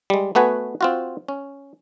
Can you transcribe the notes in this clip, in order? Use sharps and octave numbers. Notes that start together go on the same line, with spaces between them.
G3 G#3
A3 B3 F#4 B4 G#5
C4 F4 F#4
C#4